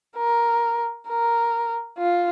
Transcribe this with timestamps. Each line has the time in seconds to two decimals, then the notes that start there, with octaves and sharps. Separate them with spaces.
0.16 A#4
1.08 A#4
1.98 F4